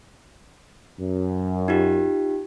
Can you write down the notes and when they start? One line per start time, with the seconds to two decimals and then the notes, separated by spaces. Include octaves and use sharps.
0.99 F#2
1.68 D#4 F4 G4